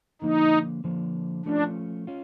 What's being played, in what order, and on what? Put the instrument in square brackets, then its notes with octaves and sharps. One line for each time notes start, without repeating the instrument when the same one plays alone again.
[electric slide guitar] D3 F3 A#3 [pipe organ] D#4
[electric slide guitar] D3 F3 A#3
[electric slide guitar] F3 A3 C#4 F4 [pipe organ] D4
[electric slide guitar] C#4 F4